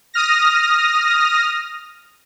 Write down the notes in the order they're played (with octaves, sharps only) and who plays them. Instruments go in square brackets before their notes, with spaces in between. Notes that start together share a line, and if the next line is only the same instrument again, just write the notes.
[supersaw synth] D#6 F6 A#6